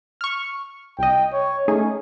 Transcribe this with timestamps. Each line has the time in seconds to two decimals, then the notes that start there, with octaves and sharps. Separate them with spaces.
0.21 C#6 F6
0.99 C2 D#5 G5
1.33 C#5
1.68 A3 C#4 D#4 G#4